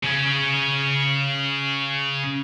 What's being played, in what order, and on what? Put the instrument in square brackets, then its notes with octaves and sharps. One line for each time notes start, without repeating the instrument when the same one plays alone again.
[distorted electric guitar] C#3 C#4